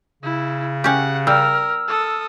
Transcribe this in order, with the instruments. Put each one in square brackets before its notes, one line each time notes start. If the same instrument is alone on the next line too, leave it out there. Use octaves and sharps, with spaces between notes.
[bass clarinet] C#3 [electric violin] E4
[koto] C#4 G4 [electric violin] F#5
[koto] G3 [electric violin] A#4 [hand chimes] E6 F6
[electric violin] A4 D#6